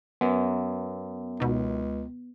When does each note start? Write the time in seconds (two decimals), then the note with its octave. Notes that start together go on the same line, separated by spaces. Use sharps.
0.21 F#2 B3
1.40 C#2 B2 D#4